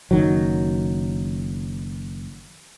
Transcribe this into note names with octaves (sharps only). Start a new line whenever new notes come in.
F#1 D#3 F#3